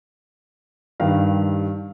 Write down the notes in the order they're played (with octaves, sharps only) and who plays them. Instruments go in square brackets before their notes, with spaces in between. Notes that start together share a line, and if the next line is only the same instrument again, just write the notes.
[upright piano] G2 D#3 G3 F5